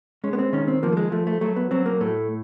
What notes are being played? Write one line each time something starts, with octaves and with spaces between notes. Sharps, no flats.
G#3 C#4
B3
C4
D#3 C#4
C4
F3 A#3
A3
G#3
F3 A3
A3
F#3 A3
B3
F#3 C4
A#3
A2 A3